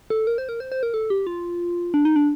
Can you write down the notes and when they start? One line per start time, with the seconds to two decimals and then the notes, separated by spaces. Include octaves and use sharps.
0.10 A4
0.27 A#4
0.38 C5
0.49 A#4
0.60 C5
0.72 C5
0.83 A#4
0.94 A4
1.10 G4
1.27 F4
1.94 D4
2.05 D#4
2.16 D4